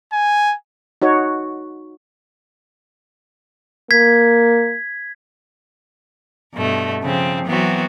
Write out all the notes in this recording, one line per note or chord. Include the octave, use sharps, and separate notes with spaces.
G#5
D#4 F#4 C#5
A#3 G#6 B6
G2 B2 A3
C#3 F3 C4
E3 F#3 B3 C4 F#4